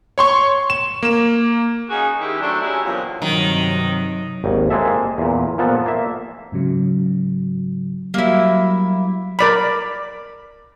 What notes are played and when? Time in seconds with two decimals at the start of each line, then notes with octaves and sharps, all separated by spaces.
0.18 C#5 C6 C#6
0.70 E7
1.03 A#3 E7
1.90 A#3 C#4 D#4 F#4 G#4
2.18 D#3 G#3 E4 G4
2.40 F#3 A3 C4 D4
2.62 F#3 G#3 C#4 E4 G4 G#4
2.83 E2 G2 A#2 C#3 F3
3.22 G2 C3 D#3 F#3
4.44 G#1 D#2
4.70 G#3 A#3 C4 G#4 A4 E5
5.18 E2 A#2
5.58 A#2 F3 B3 A4
5.86 A#3 E5
6.52 G#2 C#3 F#3
8.14 F#3 G3 A#3 E4
9.39 A#4 D5 B5